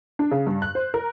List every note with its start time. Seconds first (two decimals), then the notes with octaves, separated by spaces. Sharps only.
0.19 D4
0.31 C#3
0.47 G2
0.62 F#6
0.75 C5
0.94 A#4